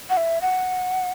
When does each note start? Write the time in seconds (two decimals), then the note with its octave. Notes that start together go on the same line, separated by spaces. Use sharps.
0.10 F#5
0.17 E5
0.42 F#5